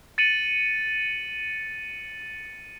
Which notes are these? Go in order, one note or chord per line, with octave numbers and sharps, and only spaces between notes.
A6 C#7 D#7 F#7